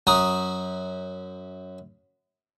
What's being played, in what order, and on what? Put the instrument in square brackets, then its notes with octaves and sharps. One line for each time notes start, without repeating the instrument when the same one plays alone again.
[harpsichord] F#2 F#4 A#5 D#6